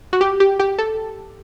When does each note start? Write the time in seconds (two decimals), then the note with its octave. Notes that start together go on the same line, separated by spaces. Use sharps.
0.13 F#4
0.21 G4
0.40 G4
0.60 G4
0.78 A4